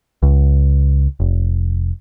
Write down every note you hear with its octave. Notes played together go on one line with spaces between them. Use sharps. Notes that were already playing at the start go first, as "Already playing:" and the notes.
C#2
F1